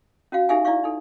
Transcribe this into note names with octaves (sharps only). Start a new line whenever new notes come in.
C#4 F#4 F5
D#4 G4 A4 E5 F5 G#5
E4 D5 E5 F5 C#6
D#4 A4